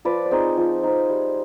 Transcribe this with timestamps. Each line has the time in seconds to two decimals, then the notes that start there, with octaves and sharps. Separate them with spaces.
0.05 F3 B4 D5
0.26 D5
0.31 C4 D#4 G#4 C5
0.57 F3
0.83 C4 D#4
1.09 G3